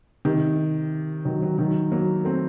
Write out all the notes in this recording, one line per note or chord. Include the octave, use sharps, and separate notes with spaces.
C3 D#3
D#3 F#3
D#3 F#3
D#3 F#3
F#3 A#3
A3 C4